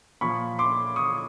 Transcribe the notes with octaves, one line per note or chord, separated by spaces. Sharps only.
A#2 F3 B5 C#6
C6 D6
C#6 D#6